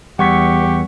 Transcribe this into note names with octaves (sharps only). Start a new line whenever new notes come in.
E2 G3 G4 F#5 C#6 B6